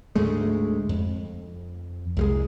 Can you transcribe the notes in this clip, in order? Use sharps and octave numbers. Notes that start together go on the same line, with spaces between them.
D2 G#2 G#3 A3
F2
C2 G3 G#3